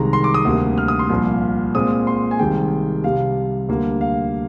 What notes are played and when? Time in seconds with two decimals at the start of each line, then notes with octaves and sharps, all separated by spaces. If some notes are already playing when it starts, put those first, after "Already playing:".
Already playing: C2 C3 D#3 G#3 A#5
0.13 C6
0.24 D6
0.34 D#6
0.45 D2 C3 G3 A#3
0.78 F6
0.88 D#6
0.99 C6
1.10 C2 A#2 F3
1.75 A#2 G#3 C4 D#6
2.07 C6
2.31 G#5
2.39 C2 C3 D#3 G#3 G5
3.04 C2 C3 G3 F5
3.69 D2 D3 G3 A#3
4.01 F5